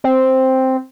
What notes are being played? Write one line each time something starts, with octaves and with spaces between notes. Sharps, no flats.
C4